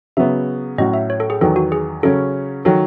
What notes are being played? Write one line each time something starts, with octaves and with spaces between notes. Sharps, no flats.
C#3 F#3 B3 E5
A2 F#3 C#4 F#4 D#5
E5
C#5
A4
G#4
E2 D#3 F#3 A4
F#4
G#4
C#3 F#3 C#4 A4
D#3 F#3 A4